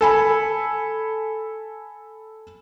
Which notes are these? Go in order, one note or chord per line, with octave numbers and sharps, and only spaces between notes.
A4 G#5 B5